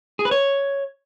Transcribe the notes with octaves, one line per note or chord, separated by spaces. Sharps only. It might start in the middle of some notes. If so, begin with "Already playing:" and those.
G#4
B4
C#5